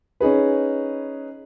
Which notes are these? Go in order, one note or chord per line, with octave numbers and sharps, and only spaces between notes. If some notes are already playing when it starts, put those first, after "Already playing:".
C#4 D#4 G#4 B4